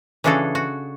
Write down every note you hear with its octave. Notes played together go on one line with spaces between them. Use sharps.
C#3 E3 D4 F#4 G#4 A4
F#4